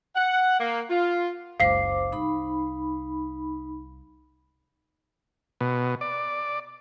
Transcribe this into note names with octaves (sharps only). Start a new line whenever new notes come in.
F#5
A#3
F4
F#1 C#2 C5 F5 D6 C7
C2 D#4 B5
B2
D5